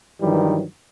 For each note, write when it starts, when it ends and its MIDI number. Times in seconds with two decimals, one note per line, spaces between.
0.22 0.64 43
0.22 0.64 51
0.22 0.64 52
0.22 0.64 54
0.22 0.64 55